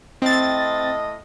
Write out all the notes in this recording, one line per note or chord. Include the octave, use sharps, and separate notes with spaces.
A2 C4 D#5 A6